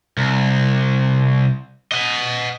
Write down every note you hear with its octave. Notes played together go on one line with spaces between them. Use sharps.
C2
D#5 F#5